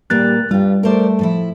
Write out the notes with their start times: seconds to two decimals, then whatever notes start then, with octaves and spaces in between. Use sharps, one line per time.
0.10 A#2 D#3 G3 A#3 F#6 A6
0.51 G2 G3 F4 G4
0.83 A3 A#4 C5 D5
1.19 A2 F3 E4